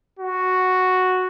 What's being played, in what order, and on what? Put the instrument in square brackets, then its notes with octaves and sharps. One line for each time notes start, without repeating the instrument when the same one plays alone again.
[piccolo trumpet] F#4